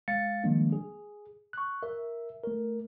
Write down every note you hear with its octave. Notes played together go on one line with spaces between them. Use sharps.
G#3 F5 A6 C#7
D#3 F3 G3 G#3 A#3 D4
G#4
C#6 F#6
A#4 E5
A3 A#4